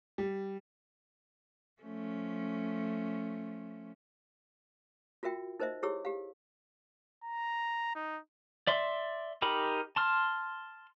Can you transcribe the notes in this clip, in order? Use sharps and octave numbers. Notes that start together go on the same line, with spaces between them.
G3
F3 A3 C#4
F4 F#4 A#4 E5 G5
D#4 A#4 C5 D#5 E5
E4 G4 G#4 C#5 E6
G4 F5
A#5
D#4
D5 E5 C6
D#4 G4 A#4 B5
A5 C6 F6